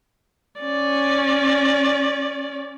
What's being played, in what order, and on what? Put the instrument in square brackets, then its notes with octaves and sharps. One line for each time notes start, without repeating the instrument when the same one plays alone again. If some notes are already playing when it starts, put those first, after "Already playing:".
[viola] C#4 D5